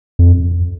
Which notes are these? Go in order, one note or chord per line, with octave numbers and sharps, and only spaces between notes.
F2